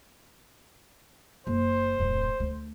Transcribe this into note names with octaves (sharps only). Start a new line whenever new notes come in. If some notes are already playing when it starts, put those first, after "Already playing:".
F#1 C5
D1 F2
D2